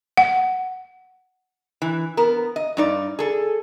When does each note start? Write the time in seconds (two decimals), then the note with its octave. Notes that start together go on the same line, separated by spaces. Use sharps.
0.17 F#5
1.82 E3
2.17 B3 A#4
2.56 D#5
2.77 G2 D#4 D5
3.19 G#4 A4